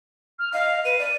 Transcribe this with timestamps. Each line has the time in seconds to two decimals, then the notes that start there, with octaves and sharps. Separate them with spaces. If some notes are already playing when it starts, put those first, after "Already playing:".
0.39 F6
0.53 D#5 F5
0.85 B4 D#7
0.99 D5